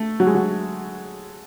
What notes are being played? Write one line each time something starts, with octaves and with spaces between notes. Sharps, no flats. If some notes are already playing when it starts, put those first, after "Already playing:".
Already playing: A3
F#3
G#3
F#3